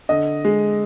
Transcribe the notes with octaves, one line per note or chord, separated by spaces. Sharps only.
D3 D#5
G#3